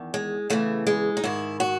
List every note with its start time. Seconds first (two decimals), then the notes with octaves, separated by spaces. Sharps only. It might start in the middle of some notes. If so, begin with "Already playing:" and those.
Already playing: E2 D#3
0.14 G#3
0.50 E2 C#3 E3 A3
0.87 G#3
1.17 D#4
1.24 G#2 D#3 E4
1.60 F#4